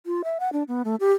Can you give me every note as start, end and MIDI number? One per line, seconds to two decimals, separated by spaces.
0.06 0.22 65
0.24 0.38 76
0.40 0.52 78
0.53 0.63 62
0.68 0.82 59
0.85 0.96 57
1.00 1.12 67